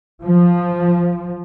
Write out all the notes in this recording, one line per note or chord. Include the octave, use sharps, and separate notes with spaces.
F3